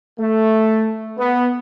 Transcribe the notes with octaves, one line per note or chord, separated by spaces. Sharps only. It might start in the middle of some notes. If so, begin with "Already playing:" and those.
A3
B3